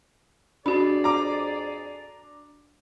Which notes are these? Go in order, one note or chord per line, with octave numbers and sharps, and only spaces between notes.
F2 D4 F#4 G#4 D5 B5
A#5 D6